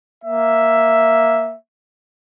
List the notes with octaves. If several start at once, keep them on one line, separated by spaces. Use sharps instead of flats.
A#3 E5